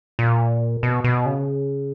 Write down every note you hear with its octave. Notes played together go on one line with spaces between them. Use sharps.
A#2
B2
B2
C#3